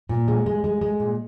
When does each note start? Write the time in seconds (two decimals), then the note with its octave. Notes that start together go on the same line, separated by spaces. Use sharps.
0.09 A#2
0.28 G#3
0.46 G#3
0.64 G#3
0.81 G#3
1.00 A#2